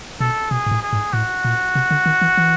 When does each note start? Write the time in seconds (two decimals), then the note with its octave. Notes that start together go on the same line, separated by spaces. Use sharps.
0.20 B2 A4
0.51 B2 G#4
0.67 G#2
0.71 A2
0.83 G#4
0.93 G#2
1.13 A2 F#4
1.45 A#2
1.75 C3
1.91 D3
2.06 D#3
2.22 E3
2.37 E3